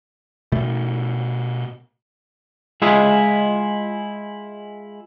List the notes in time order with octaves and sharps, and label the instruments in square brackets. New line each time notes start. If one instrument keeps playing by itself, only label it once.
[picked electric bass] B2 A3
[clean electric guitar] G#3 E4 F4 G#4 D#5 E5